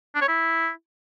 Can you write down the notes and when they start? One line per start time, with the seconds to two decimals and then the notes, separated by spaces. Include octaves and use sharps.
0.15 D4
0.22 C#5
0.28 E4